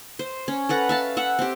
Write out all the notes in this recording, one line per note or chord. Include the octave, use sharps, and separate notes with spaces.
C5
C#4
A4 B4 F#5 A#5
E5 F5 A5
E5 F#5
C4 G4